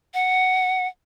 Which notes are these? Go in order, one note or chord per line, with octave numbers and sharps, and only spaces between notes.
F#5